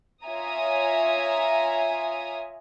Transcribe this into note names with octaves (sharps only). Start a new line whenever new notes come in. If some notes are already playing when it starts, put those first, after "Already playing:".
F4 C#5 E5 G#5 A#5 D#6